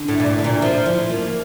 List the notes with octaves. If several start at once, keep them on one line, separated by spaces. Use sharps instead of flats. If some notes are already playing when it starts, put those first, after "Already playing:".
Already playing: D3
A2
E4
A#2
A2
D3
A#2
F3 E4
F3
A#3